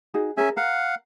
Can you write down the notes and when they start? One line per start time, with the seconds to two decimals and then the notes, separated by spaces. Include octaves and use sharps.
0.14 D#4 F#4 G#4
0.37 C#4 G#4 A#4 E5 G#5
0.57 A#4 F5 F#5